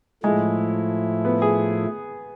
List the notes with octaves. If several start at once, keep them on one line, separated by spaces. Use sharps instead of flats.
A2 F3 G#3 A3 E4
B3
G#4